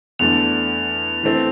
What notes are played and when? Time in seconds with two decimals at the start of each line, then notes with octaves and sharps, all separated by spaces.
0.19 E2 D3 A3 F7
1.23 E3 A3 C4